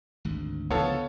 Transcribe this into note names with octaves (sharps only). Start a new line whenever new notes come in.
G#1 D2
C#2 D3 F3 B3 A4 C#5 F5